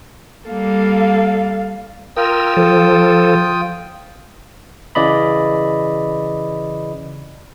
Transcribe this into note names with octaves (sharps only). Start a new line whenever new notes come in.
G3 A#3 A4 F5
F4 A#4 G5 D#6 E6
F3 A4
C#3 E3 D5 D#5 B5